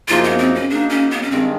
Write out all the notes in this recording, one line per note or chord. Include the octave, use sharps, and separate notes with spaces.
F#2 C#3 F3 A#3 D#4 F4
B3
C4
C#4
C#3 F#3 A#3 D4 D#4
C#4
B3
C#4
G2 D#3 G#3 C4